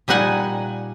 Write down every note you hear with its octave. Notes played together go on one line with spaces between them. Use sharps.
A#2 G3 D#4 F#5 G#5